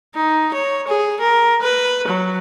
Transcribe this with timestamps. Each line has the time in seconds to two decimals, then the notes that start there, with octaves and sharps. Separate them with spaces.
0.15 D#4
0.54 C#5
0.87 G#4
1.21 A#4
1.62 B4
2.08 F#3